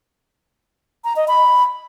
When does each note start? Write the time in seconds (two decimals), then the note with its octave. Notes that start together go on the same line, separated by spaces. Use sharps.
1.04 A#5
1.16 D#5
1.28 B5